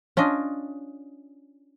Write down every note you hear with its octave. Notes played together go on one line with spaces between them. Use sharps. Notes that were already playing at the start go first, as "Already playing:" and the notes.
C#4 D4 F4 D#5